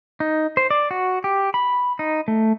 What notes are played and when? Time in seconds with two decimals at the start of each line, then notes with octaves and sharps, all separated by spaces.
0.20 D#4
0.57 C5
0.71 D5
0.91 F#4
1.24 G4
1.54 B5
1.99 D#4
2.28 A3